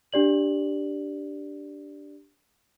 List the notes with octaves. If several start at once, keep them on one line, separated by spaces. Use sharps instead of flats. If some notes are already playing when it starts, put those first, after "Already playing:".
D4 G4 D5 F#7